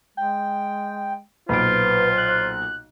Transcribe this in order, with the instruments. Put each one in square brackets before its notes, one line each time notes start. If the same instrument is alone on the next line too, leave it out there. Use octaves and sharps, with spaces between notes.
[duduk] G#3 [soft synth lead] G5
[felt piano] B1 A#2 D7 [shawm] F4 [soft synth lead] B4 [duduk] C5
[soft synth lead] F#6